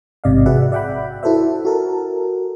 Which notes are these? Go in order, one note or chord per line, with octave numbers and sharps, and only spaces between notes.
A1 G#2 C3 D5 D#5 F5
F#4 G#4 B4 D5 E5 F#5
D5 E5 F#5 G5 B5
E4 F#4 A4 B4 C5 E5
F#4 A4 A#4